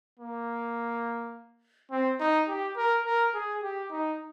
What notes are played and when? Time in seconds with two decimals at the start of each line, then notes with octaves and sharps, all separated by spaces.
0.20 A#3
1.91 C4
2.20 D#4
2.48 G4
2.77 A#4
3.06 A#4
3.34 G#4
3.63 G4
3.91 D#4